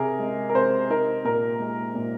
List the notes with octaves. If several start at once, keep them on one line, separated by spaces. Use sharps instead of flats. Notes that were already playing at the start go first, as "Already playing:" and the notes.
Already playing: C3 G#4 A#4
G#3
A#4
C3 C5
D#4 A#4
A#2 A#4
G#3
A#2